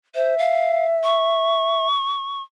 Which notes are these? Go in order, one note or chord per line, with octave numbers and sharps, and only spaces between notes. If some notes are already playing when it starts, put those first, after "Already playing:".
C5 E5
F5
C#6